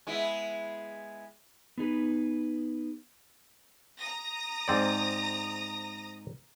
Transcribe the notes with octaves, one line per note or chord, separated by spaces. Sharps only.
G#3 B3 E4
B3 D#4 G#4 B4
A#5 D#6 A#6
G#2 C4 D5